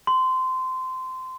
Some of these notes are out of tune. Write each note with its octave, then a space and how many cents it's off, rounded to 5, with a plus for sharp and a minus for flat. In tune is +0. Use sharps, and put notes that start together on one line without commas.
C6 -20